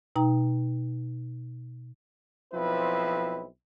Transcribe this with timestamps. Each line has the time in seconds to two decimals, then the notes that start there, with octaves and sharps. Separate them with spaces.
0.16 B2 D#4 G5 A#5
2.53 B1 F3 C4 E4 B4